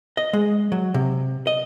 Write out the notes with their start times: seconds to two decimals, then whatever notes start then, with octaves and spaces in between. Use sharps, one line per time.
0.17 D#5
0.33 G#3
0.72 F#3
0.94 C3
1.47 D#5